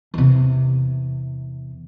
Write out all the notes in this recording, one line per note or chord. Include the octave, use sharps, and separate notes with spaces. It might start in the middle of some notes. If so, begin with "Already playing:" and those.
E2 C3